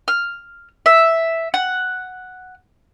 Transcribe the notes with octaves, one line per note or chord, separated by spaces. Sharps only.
F6
E5
F#5